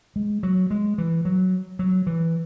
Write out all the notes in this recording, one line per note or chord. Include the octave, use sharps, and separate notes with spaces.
G#3
F#3
G#3
E3
F#3
F#3
E3